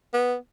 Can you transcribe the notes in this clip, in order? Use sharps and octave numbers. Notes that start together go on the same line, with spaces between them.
B3